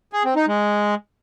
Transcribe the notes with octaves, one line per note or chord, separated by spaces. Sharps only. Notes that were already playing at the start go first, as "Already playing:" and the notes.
G#4
C4
D#4
G#3